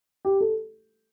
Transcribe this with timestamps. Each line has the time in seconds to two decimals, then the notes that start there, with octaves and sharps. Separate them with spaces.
0.25 G4
0.41 A4